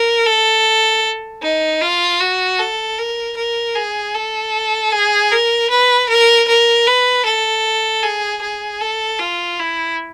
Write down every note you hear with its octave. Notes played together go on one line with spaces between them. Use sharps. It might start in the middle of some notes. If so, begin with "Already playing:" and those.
Already playing: A#4
A4
D#4
F4
F#4
A4
A#4
A#4
G#4
A4
G#4
A#4
B4
A#4
A#4
B4
A4
G#4
G#4
A4
F4
E4